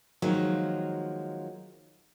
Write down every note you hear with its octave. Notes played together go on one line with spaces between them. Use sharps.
D#3 F3 F#3 G#3 A#3